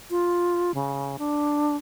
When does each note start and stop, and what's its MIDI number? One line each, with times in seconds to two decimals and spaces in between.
0.10 0.72 65
0.74 1.17 49
1.19 1.76 62